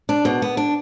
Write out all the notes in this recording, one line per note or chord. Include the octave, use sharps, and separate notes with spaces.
D4
B2
B3
D4